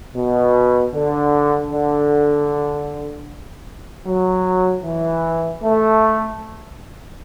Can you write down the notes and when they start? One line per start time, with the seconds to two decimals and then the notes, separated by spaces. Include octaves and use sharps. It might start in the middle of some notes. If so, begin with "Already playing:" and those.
0.15 B2
0.93 D3
1.71 D3
4.06 F#3
4.83 E3
5.62 A3